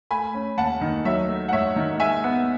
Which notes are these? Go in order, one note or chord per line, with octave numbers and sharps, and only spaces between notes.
A3 G#5 B5
C#4
D#2 F#5 A5
D#3
F#3 C#5 E5
A3
F#5
G#2 C#5 E5
D#3
G#3 E5 G#5
B3